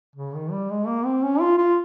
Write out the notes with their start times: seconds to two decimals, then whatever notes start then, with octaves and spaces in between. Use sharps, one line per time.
0.16 C#3
0.35 D#3
0.52 G3
0.70 G#3
0.88 A#3
1.05 C4
1.23 C#4
1.40 F4
1.58 F4